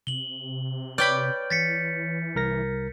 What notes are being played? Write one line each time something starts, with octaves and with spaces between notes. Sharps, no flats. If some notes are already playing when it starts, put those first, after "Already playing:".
C3 F#7 G7
B4 C#5 D5 G5 B5 F6 G6
E3 A6 B6 C#7
C2 A#4 A#6